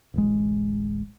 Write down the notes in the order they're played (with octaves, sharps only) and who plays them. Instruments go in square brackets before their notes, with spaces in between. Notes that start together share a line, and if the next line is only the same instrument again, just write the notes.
[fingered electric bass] D1 A1 G#3